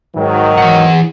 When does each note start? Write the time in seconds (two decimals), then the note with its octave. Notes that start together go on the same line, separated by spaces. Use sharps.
0.15 G#2 D#3 F#3
0.58 E3 F#5